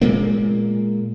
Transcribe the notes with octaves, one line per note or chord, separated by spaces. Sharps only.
A#2 G#3 A#3